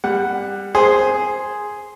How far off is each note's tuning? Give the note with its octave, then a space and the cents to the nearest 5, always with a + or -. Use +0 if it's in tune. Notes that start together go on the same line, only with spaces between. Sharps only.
G3 +20 F#5 +0
G#4 +0 C5 +0